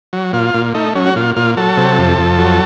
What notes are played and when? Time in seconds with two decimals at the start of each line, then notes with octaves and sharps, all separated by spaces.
0.13 F#3
0.33 A#2 F4
0.54 A#2
0.74 A3 D#4
0.95 F#3 C#4
1.06 F#4
1.16 A#2 F4
1.36 A#2 F4
1.57 F#3 A4
1.77 C3
1.98 F2
2.18 F2
2.39 F#3